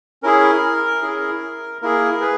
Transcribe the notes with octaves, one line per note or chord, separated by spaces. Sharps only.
C#4 E4 G#4 A#4
C#4 E4 G#4
A#3 E4 G#4 A#4
G#4 B4